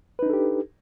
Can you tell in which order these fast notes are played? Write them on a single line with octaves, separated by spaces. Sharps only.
B4 D#4 D4 A4 G4